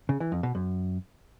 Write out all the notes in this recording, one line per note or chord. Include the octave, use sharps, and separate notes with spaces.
C#3
E3
F2
B2
F#2